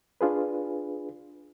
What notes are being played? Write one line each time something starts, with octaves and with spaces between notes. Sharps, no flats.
D4 F4 G#4 B4